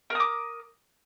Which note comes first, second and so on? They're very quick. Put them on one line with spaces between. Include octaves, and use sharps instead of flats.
A#4 D#6 D6